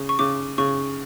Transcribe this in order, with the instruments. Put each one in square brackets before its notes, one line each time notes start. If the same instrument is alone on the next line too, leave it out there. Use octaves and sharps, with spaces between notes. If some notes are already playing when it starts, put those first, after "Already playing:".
Already playing: [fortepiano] C#3
[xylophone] C#6
[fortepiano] C#3 [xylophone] D6
[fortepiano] C#3 [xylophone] C#6